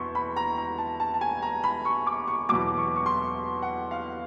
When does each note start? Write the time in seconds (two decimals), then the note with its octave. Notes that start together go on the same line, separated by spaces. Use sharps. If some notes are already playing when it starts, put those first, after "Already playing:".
Already playing: E2 B2 C6 C#6
0.15 B5
0.36 A#5
0.58 A#5
0.78 A5
1.00 A5
1.14 A5
1.21 G#5
1.42 A#5
1.64 B5
1.85 C#6
2.06 D6
2.28 C#6
2.49 E2 B2 F#3 D6
2.77 C#6
2.96 C#6
3.06 C6
3.62 F#5
3.91 F5